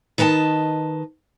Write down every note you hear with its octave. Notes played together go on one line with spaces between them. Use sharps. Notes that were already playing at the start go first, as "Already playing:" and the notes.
D#3 B4 D#5 G5 A5